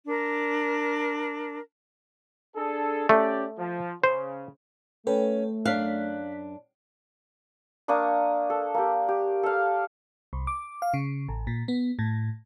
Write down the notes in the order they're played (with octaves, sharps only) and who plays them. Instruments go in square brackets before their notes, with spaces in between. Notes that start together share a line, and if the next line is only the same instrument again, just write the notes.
[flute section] D4 A#4
[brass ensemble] D4 G#4 A4
[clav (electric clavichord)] A3 [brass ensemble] C#4 G4 D5
[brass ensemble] F3
[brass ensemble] C#3 [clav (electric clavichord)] C5
[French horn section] A3 [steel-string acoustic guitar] C#4 [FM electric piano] A4 B4 G5
[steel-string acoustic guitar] F#2 D4 [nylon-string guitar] F5 [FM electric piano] F#6 B6
[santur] A#3 D4 C#6 D#6
A4
A#3 G4
G4
A4 F5
[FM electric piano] C2
D6
F5
C#3
A1
A#2
B3
A2